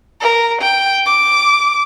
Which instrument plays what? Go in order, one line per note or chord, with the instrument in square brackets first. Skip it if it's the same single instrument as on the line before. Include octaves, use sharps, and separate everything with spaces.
[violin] A#4
G5
D6